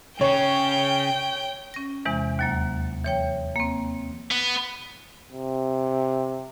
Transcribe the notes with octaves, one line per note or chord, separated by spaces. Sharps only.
C#3 C#4 C#5 G5
C#4 A#6
E2 C3 E3 G#3
D#2 F#3 A#3
E3 C#5 G5
A#3 C4
B3
C3